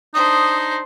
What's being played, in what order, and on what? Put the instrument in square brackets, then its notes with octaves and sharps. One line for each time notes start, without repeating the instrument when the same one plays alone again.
[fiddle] D4 C5 [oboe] D#4 [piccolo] D#6